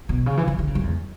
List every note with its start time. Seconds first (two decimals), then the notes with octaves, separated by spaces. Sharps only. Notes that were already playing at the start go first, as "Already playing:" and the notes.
0.09 B2
0.26 C#3
0.37 E3
0.48 D3
0.59 D3
0.67 C#3
0.75 F#2
0.84 E2